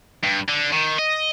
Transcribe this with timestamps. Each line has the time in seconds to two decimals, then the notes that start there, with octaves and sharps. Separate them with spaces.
0.24 G2
0.49 D3
0.73 D#3
0.99 D#5